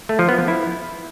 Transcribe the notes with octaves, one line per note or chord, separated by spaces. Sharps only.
A3
F3
B3
F3
E4